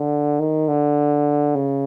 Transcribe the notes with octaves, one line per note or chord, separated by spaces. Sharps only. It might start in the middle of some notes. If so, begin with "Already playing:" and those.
Already playing: D3
D#3
D3
C#3